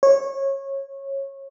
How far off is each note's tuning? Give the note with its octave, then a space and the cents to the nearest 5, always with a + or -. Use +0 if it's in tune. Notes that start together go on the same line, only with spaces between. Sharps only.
C#5 -20